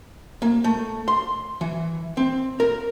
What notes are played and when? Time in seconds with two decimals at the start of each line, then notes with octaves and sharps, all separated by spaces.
0.42 A#3
0.64 A3
1.08 C6
1.61 E3
2.17 C4
2.60 A#4